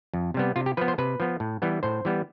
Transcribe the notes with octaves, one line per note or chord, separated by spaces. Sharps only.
F2
C3 G3 B3
C3 F4
G4
F3 B3 B4
C5
C3 B4
F3 B3
A2
E3 G3 B3
A2 C5
E3 G3 B3